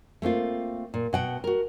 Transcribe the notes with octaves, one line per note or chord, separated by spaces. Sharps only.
A3 A#3 C4 F4
A#2
B2 F#5 G5
F#4 A#4